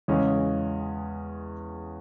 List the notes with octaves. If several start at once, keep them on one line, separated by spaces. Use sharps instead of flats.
E2 C#3 G#3 C#4